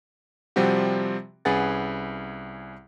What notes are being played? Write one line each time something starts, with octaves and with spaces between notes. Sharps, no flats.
C3 F3 G3 C4 F#4 G4
C2 C#4 G#4 B4 F#5 A6